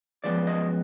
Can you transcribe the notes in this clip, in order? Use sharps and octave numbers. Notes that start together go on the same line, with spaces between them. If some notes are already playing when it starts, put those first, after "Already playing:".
F#2 F3 G#3 B3 D5
D#5